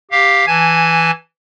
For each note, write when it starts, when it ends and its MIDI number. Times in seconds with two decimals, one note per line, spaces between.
0.11 0.45 67
0.11 0.45 77
0.47 1.11 52
0.47 1.11 80
0.47 1.11 81
0.47 1.11 92